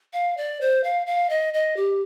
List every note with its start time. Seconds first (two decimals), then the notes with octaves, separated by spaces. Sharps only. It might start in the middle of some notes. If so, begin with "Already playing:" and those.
0.13 F5
0.37 D5
0.61 C5
0.84 F5
1.07 F5
1.30 D#5
1.54 D#5
1.77 G4